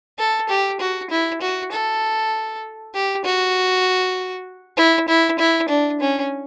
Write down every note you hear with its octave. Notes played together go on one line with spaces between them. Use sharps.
A4
G4
F#4
E4
F#4
A4
G4
F#4
E4
E4
E4
D4
C#4